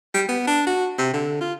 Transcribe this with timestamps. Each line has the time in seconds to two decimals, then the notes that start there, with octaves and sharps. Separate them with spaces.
0.14 G3
0.29 B3
0.47 D4
0.67 F#4
0.98 C3
1.13 D3
1.41 F4